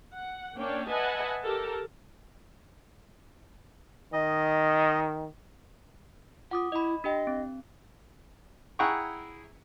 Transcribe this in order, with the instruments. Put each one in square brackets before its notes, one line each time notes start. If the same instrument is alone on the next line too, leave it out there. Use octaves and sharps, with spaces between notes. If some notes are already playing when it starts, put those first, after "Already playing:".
[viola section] F#5
A#3 C#4 D4 C#5 D5 G5
B4 D#5 E5 F#5 G#5 A5
G4 A4 A#4 A5
[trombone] D#3 [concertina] D#5
[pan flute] F4 [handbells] F#5 D6 D#6
[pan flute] E4 [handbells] D#5 B5
[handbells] D4 G4 G5 [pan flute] D#5
[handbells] C4
[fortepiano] E4 G#4 F#5 G5 A#5 C#6